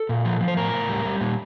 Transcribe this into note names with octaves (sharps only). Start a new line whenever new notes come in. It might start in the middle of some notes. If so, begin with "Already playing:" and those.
Already playing: A4
A#2
F3
F3
C5
A2 A#4
A2
G3
G3
A#2